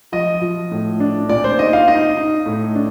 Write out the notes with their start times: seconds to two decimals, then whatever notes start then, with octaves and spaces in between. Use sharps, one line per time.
0.12 F3 D#5
0.41 F3
0.72 A2
1.00 D4
1.29 A#2 D5
1.44 C5
1.59 D#4 D#5
1.73 F5
1.88 D#4 D#5
2.17 D#4
2.46 A2
2.75 D4